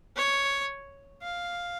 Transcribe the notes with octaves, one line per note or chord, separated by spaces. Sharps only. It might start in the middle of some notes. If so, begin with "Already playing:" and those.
C#5
F5